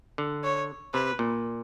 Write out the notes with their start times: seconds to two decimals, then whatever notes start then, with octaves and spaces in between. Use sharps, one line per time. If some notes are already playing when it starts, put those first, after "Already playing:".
0.18 D3
0.44 C#5
0.94 C3 B4
1.19 A#2